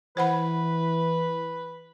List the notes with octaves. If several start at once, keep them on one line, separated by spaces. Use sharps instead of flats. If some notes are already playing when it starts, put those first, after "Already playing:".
E3 B4 C5 F#5 B5